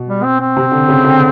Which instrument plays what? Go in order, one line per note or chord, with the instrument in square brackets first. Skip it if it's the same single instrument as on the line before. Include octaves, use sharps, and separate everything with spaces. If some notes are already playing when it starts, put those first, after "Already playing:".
Already playing: [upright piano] B2
[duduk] G3
C4
C4
[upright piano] C3
D3
C#3
D3